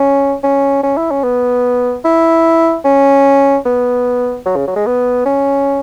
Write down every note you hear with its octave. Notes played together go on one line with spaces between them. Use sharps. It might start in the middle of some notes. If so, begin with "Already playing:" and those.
Already playing: C#4
C#4
C#4
E4
C#4
B3
E4
C#4
B3
F#3
C#3
F#3
G#3
B3
C#4